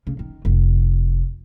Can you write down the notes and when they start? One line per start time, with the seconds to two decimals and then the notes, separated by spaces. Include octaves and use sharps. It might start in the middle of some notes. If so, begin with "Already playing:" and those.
0.07 C#3
0.19 D#3
0.45 F1